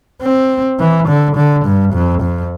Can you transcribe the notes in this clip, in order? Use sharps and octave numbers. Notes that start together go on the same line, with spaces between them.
C4
E3
D3
D3
G2
F2
F2